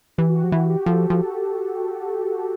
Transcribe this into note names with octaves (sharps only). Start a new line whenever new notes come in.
E3 G4
F#4
G4
F3
E3 F#4
G4
F3 G4 A4
F3